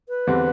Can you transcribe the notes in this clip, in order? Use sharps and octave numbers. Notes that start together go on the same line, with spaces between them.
B4
E2 D3 G3 C4